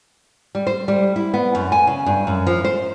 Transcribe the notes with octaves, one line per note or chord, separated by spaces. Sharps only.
G3
C5
G3
E4
B3
F#2
G#5
C#3
G2
F#2
F3
C5